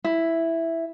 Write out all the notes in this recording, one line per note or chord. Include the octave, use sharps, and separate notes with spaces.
E4